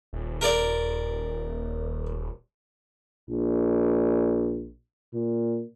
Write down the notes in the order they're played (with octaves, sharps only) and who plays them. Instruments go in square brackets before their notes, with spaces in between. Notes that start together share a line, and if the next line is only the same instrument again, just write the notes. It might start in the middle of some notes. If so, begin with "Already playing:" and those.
[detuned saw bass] D#1
[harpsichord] A#4 D5
[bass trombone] A#1
A#2